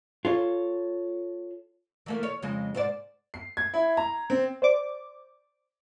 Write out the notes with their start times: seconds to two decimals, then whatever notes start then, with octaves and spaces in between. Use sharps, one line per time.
0.25 F4 A4 C#5
2.06 E3 A3 A#3
2.23 C#5
2.43 F2 C#3 G#3
2.75 G#2 C5 D5
3.34 C7
3.57 G#6
3.74 E4
3.97 A#5
4.30 C4
4.62 C5 D5 D6